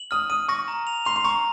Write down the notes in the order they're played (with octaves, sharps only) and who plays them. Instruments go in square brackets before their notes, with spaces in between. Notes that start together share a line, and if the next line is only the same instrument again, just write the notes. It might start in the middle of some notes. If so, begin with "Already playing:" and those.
Already playing: [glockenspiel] F#7
[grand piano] D#6 [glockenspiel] F6
[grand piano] D#6 [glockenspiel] D#7
[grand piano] C#6 [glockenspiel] A#6
[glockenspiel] A#5
F7
[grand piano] C6 [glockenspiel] F7
[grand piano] C6
[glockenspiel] A#5 [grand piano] C#6